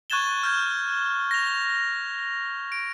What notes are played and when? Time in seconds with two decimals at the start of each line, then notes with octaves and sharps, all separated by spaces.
0.10 C#6 F#6 G#6 A6 E7 G7
0.43 F6 G6 G#6
1.31 A#6 F7
2.72 D7